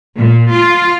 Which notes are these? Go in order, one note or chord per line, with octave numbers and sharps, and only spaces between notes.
A#2
F4